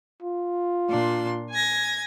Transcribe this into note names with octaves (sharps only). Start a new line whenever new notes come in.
F4
A#2 D4 C6
G#5 G#6 A#6